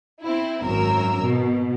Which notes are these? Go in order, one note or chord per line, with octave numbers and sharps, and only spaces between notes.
C4 E4
G#1 F#2 A#4 E6
B2